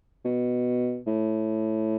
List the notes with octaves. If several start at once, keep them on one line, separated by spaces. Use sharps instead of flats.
B2
A2